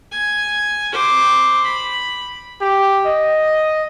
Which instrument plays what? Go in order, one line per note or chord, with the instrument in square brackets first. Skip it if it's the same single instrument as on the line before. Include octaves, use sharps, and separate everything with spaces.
[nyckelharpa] G#5
C5 D6
B5
[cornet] G4
D#5